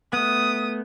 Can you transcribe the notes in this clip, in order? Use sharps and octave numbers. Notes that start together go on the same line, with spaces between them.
A3 B3 D#6